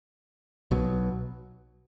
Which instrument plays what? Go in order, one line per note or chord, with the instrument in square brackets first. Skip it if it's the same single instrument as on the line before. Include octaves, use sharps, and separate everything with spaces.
[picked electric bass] B1 B2 F#3